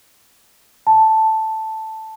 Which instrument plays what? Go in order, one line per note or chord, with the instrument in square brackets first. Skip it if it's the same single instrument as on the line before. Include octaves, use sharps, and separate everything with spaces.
[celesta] A5